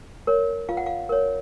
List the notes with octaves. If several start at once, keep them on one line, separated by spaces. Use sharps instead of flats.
A#4 C#5
F4 F5
F#5
F5
A#4 C#5